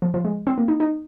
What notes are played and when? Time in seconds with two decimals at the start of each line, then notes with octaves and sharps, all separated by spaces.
0.02 F3
0.14 F3
0.25 G#3
0.47 C4
0.58 A#3
0.68 D#4
0.80 D#4